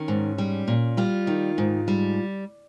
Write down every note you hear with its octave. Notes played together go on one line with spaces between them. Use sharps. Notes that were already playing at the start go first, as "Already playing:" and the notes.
Already playing: D#3 C#4
G#2
G3
A#2
G3 F4
D#3
G#2
G3